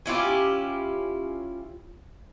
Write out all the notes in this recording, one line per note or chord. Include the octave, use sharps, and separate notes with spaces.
C#4 E4 F4 G4